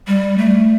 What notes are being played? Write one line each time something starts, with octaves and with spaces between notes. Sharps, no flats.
G3
A3